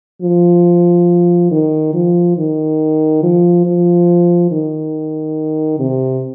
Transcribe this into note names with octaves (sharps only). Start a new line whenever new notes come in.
F3
D#3
F3
D#3
F3
F3
D#3
C3